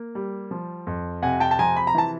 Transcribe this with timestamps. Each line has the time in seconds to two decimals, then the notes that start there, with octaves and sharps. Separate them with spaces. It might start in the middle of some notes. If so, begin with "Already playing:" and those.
Already playing: A#3
0.15 G3
0.51 F3
0.87 F2
1.23 C3 F#5 G#5
1.40 G5 A5
1.51 A5
1.59 F3 G#5 A#5
1.77 B5
1.87 A#5
1.95 E3 A5